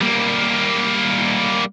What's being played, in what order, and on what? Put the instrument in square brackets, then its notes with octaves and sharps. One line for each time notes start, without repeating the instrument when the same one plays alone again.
[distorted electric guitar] G3 A#3